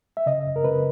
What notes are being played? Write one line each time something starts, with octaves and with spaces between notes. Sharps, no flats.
E5
C#3 D#5
F#2
A#4
C#3 B4